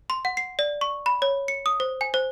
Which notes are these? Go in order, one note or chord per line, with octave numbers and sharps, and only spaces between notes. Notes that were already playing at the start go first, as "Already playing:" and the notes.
C6
F#5
C7
D5
C#6
B5
C#5
C#7
D#6
C5
G#5
C5